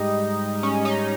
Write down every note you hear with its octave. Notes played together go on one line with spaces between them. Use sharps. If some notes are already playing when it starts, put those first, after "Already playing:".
Already playing: G#2 G3 D#4
C#4
D#4